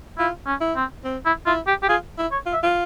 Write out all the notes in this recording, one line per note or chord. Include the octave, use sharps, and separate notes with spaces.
E4 F4
C#4
E4
C4
C4
E4
E4 F4
G4
G4
F4 G#4
E4
C#5
F4
E5
F4